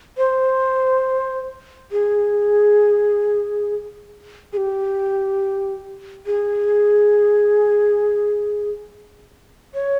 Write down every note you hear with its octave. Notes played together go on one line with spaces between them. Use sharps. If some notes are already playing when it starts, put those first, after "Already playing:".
C5
G#4
G#4
G4
G#4
C#5